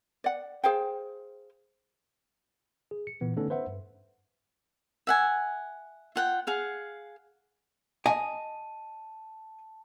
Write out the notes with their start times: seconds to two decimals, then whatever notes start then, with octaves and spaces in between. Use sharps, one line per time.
0.24 D5 F#5
0.64 G#4 C5 F5 G5
2.91 G#4
3.07 C#7
3.21 A#2 E3 B3
3.37 D3 A3 B3 C#4 D#4 A4
3.50 B4 C5 E5 F#5
3.67 G2
5.07 E5 F#5 G#5
6.16 F4 F#5 G5
6.47 G#4 F5 F#5
8.06 D#5 G#5 A5